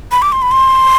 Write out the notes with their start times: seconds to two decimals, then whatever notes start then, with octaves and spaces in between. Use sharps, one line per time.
0.12 B5
0.22 D6
0.32 C6
0.42 B5
0.51 C6